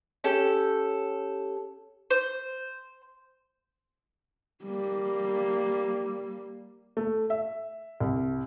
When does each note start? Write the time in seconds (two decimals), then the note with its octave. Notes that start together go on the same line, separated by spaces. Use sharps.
0.24 C#4 G4 A4
2.10 C5
4.65 G3 A#3
6.97 A3
7.30 E5
8.00 C2